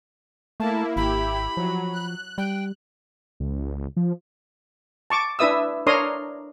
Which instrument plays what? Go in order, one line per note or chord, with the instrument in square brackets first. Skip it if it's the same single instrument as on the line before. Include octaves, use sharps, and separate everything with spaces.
[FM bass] A3 [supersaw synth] A#3 E4 [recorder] A5
[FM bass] G#1 [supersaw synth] E4 G4 [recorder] B5
[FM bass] F3 [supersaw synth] F#3
[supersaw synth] F#6
[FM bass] G3 [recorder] G5
[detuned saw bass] C#2
F3
[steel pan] A5 C#6 D6
D4 E4 B4 E5 D#6 E6
D4 A#4 C#5 A#5 C6 D#6